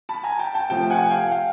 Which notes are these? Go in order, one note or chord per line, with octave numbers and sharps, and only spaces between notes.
A5 B5
G#5 A#5
G5 A5
G5 A5
C3 F3 A3 G5 A5
F#5 G#5
G#5
F5 G5
F5 G5